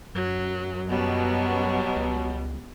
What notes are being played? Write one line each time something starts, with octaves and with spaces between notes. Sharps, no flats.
F#2 F#3
B2 F#3 G3 B3
C#2